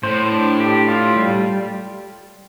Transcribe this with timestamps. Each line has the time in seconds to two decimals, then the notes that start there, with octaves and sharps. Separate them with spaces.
0.03 A2 C5
0.32 D4
0.60 G4
0.88 F4
1.16 G3